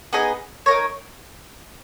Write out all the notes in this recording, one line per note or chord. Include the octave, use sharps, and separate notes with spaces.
B3 D#4 G#4 D#5
D#4 A#4 C#5